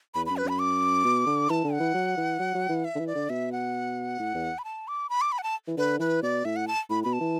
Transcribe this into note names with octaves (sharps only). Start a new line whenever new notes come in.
E2 B5
F#2 B5
B4
F#2 B5
D6
B2
D3
E3 A5
D3
F#5
E3
F#3
E3
F#3
F#3
E3
E5
D3
E3
D5
D3
B2 E5
F#5
A2
E2
B5
A5
D6
B5
D6
B5
F#5
A5
E3
D3 B4
E3 B4
B2 D5
A2 E5
F#5
A5
A2 B5
B2 B5
A5
E3